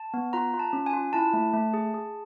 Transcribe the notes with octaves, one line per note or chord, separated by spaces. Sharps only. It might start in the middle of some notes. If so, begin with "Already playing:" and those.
Already playing: A5
B3
F4 A#5
F4
A5
C#4
G#5
F4
E4 A5
A3
A3
G#4
G#4